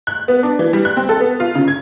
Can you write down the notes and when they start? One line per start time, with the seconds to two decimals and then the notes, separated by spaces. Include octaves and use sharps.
0.07 F#6
0.28 B3
0.43 D4
0.59 E3
0.73 G3
0.85 F#6
0.97 C4
1.09 A4
1.20 B3
1.40 F4
1.55 C#3
1.68 G#6